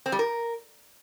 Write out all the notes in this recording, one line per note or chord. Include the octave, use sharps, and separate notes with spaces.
C4
G3
A#4